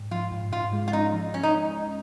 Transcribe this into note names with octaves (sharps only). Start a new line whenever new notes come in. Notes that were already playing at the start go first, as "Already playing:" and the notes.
Already playing: G#2
F3 F4
G#2
G#2 F4
G#3
F4
C#4 D#4
F3
F3 C#4
D#4